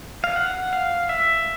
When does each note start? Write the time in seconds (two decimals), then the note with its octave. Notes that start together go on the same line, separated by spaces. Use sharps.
0.24 F5
0.36 F#5
0.73 F5
1.09 E5